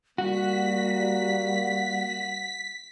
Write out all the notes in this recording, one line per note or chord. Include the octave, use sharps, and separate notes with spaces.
G3 A#3 F#4 B6